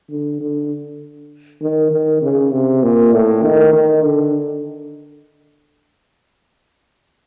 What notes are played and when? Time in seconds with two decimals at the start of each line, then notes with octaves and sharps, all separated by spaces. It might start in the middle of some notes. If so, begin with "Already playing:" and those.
0.10 D3
0.40 D3
1.62 D#3
1.91 D#3
2.22 C#3
2.52 C3
2.83 A#2
3.13 A2
3.43 D#3
3.73 D#3
4.03 D3